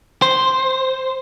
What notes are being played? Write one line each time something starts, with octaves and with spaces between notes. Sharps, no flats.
C5